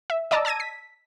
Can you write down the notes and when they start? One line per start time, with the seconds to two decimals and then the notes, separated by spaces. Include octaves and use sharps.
0.10 E5
0.31 D5 D#5 A5 A#5 D6 E6
0.45 A5 E6 G#6 A#6 D#7
0.60 B6